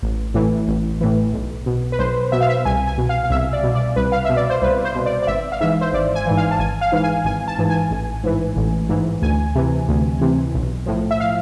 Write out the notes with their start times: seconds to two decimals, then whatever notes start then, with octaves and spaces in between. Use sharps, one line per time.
0.02 A1
0.34 A2 E3
0.68 A1
1.01 A2 E3
1.33 B1
1.66 B2
1.92 B4
1.99 B1 C5
2.32 B2 E5
2.41 F5
2.49 E5
2.65 C2 G#5
2.87 G#5
2.98 B2
3.09 F5
3.24 F5
3.30 C2 E5
3.53 D5
3.63 B2
3.75 D5
3.96 C2 B4
4.12 F5
4.25 B2 E5
4.37 D5
4.50 C5
4.62 C2 B4
4.85 C5
4.95 B2
5.06 D5
5.23 D5
5.27 G#1 E5
5.52 F5
5.61 G#2 E3 E5
5.81 C5
5.93 G#1 D5
6.15 G#5
6.26 G#2 E3
6.37 F5
6.51 A5
6.59 G#1 G#5
6.81 F5
6.92 G#2 E3 F5
7.03 G#5
7.25 G#1 G#5
7.48 A5
7.58 G#2 E3
7.70 G#5
7.91 A1
8.23 G#2 E3
8.57 A1
8.89 G#2 E3
9.22 D2 G#5
9.55 C3 E3
9.89 D2
10.21 C3 E3
10.54 B1
10.86 A2 F3
11.11 E5
11.20 F5